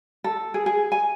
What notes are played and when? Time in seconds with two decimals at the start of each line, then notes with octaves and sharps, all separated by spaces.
0.24 A4
0.54 G#4
0.66 G#4
0.92 G#5